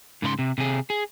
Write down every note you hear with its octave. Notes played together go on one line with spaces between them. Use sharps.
G#2 C#3 A#4 C6
C3
C3 G#4
G#4